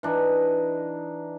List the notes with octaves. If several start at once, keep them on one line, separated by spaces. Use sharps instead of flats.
E3 D4 D#4 D#5